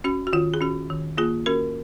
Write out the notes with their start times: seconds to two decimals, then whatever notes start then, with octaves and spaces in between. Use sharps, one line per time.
0.04 C#4 F#4
0.27 F#4
0.33 D#3 F4
0.54 G#4
0.61 C#4 F#4
0.90 D#3
1.17 A#3 F4 G#4
1.46 C#4 F#4 A#4